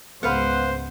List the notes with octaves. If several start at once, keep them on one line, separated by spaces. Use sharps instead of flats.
C#2 G#2 B3 B4 C5 F5 F#5